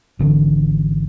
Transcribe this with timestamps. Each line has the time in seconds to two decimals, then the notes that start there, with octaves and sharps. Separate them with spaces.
0.19 G#1 D3 E3